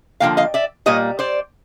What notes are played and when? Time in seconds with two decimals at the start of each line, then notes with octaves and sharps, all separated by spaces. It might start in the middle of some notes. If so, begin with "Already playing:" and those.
0.20 D3 F3 A#3 F5 G5
0.37 D#5 F5
0.54 D5 E5
0.86 A#2 G3 A#3 C#5 D#5
1.19 C5 D5